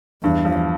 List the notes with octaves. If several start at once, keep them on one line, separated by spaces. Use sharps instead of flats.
E2 G2
F3